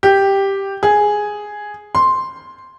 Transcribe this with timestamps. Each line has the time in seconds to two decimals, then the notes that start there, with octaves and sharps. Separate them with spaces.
0.03 G4
0.83 G#4
1.95 C6